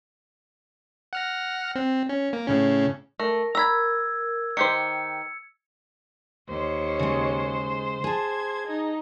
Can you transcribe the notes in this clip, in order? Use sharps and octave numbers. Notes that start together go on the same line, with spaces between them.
F#5 F6 A#6
C4
C#4
A#3
A2 C#3 C#4
A3 A#4
A#5 B5 E6 G#6
D#3 G4 C5 C#7
D#2 C5 C#5
C#3 G#3
G#4 A5 G#6
D#4